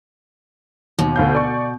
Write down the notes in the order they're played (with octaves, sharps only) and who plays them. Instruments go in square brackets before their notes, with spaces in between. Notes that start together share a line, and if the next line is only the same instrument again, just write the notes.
[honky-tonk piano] D#2 [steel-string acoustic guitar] B2
[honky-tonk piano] D2 F5 G6
D5 C#6